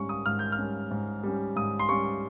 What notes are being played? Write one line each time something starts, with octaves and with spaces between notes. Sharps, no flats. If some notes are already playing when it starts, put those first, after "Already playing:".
Already playing: G#2 G3 C#4 C#6
D#6
G#2 F6
G6
F6
G3 C#4
G#2
G3 C#4
G#2 D#6
C6
G3 C#4 C#6